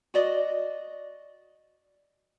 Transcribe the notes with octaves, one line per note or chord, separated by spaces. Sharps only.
F#4 D5 D#5